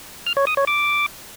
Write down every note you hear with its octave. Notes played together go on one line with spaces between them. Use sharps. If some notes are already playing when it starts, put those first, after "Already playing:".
F6
C#5
D#6
C#5
D6